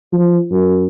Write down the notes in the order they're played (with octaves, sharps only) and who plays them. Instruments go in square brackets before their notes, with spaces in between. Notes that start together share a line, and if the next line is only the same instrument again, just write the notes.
[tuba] F3
F#2